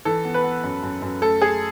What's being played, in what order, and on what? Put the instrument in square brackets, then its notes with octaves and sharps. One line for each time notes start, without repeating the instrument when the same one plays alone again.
[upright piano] E3 [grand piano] A4
[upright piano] B3
[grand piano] B4
[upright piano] B3
F#2
F#2
F#2
[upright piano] A3 [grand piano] A4
[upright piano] A3 [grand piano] G#4